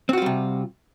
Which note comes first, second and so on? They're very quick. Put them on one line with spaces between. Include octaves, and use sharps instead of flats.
C4 F#4 F4 G3 C3